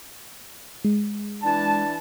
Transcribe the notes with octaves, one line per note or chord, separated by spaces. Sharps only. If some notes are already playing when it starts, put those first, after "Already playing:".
G#3
E3 D4 A5